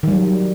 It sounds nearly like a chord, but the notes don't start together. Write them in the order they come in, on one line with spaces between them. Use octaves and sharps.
D#3 G3 F#3